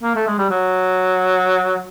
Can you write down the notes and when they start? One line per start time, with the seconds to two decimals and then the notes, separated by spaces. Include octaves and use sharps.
0.03 A#3
0.15 A3
0.27 G#3
0.38 G3
0.50 F#3